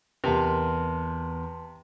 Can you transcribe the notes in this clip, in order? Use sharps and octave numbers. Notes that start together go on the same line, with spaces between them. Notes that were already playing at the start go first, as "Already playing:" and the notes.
E2 C3 A#4 B4 A5 C6 F7